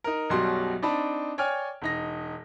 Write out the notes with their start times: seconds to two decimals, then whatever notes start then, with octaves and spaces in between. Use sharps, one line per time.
0.04 D#4 A#4
0.30 B1 F#2 B2 G3 F#4 C6
0.82 C4 D4 D#4 A5 B5
1.38 C#5 D5 G5 G#5 F6
1.82 E1 D#4 A#6